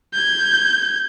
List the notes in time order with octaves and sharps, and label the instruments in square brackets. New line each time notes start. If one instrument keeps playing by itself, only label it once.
[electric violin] G6 G#6